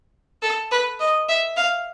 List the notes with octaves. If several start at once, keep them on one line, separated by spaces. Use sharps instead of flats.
A4
B4
D#5
E5
F5